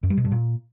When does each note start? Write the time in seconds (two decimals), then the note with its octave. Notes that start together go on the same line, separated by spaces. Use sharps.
0.03 F#2
0.10 G3
0.17 B2
0.24 G2
0.32 A#2